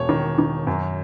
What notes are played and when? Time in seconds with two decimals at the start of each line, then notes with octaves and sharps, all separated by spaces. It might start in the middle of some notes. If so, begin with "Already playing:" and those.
Already playing: E1 C#5
0.09 D#3
0.38 D#3
0.67 F#2